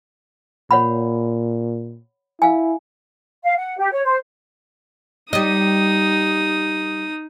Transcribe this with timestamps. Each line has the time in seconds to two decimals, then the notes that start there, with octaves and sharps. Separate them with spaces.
0.71 A#2 C#5 F#5 B5
2.42 E4 F5 G#5
3.42 F5
3.57 F#5
3.78 G4
3.92 C#5
4.03 C5
5.33 G3 D#4 D#5 D#6